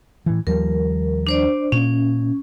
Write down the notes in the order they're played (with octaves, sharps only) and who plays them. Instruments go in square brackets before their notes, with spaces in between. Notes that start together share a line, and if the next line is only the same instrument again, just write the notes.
[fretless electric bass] A2 E3
[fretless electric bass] D#2 F3 G3 [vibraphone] A#4
[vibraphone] D4 C5 D5
[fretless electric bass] A#2 [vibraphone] C#4